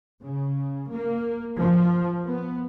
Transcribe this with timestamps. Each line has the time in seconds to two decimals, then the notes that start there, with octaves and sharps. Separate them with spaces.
0.23 C#3
0.92 A#3
1.59 F3
2.27 B3